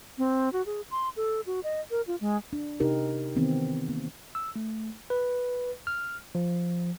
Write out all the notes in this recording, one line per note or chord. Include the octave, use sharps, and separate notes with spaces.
C4
F#4
G#4
C6
A4
F#4
D#5
A#4
F4
G#3
D4
C3 D#4 G4 A#4
D#3 E3 B3 C4
A#3
E6
A3
B4
F6
F3